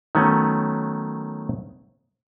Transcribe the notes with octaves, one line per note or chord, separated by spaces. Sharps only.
D#3 F#3 A3 B3 C#4